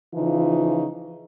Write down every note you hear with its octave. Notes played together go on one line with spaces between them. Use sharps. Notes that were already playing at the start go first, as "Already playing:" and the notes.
C#3 E3 F3 D#4 F4